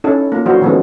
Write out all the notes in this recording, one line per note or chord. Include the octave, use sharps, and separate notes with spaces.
C#4 D#4 E4 A4
A#3 F4
E3 F#3 D4 E4 F#4 C5
D#3 F3 G#3 B3 C#4 A4